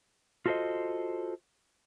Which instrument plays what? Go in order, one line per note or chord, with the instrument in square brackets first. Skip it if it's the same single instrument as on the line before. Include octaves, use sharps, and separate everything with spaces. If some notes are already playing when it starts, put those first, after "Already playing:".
[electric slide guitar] F4 F#4 A4 B4 C5 D#5